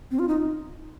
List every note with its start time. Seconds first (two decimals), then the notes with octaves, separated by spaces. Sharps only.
0.11 C4
0.19 F4
0.28 D#4